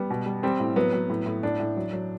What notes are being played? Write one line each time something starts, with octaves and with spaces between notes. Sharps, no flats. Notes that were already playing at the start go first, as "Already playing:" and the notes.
Already playing: G3 B3
B2
G3
G3 C4
A2
F#3 B3
F#3
A2
A2
A2 D4
A2
F#3
F#3